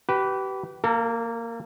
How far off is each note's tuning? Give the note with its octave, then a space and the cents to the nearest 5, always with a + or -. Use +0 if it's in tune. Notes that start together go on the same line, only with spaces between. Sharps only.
G4 -30 B4 +0
A#3 -15 A4 +40